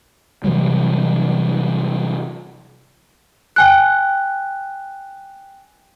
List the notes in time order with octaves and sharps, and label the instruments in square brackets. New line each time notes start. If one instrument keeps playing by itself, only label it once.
[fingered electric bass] C3 E3 F#3 G3
[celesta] G5 G#5 F#6